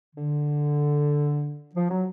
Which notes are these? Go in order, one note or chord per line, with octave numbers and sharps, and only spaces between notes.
D3
F3
F#3